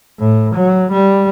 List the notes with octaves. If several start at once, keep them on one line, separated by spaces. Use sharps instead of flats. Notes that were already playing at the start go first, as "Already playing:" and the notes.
A2
F#3
G3